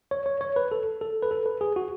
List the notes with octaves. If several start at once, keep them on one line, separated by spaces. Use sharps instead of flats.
C#5
C#5
C#5
B4
A4
A4
B4
A4
B4
G#4
F#4